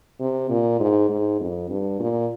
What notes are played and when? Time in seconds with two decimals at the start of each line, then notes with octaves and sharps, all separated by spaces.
0.20 C3
0.50 A#2
0.80 G#2
1.10 G#2
1.40 F2
1.70 G2
2.00 A#2